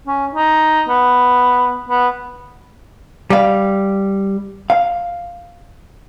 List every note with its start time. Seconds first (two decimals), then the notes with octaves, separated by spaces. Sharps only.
0.07 C#4
0.35 D#4
0.89 B3
1.89 B3
3.30 G3 F5
4.70 F5